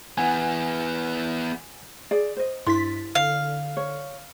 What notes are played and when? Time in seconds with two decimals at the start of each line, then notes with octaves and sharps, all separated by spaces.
0.18 E3 B3 F#5 G#5
2.11 G#4 D5
2.37 C5 D#5
2.67 G2 E4 C6 A6 B6
3.15 D3 F5
3.77 C#5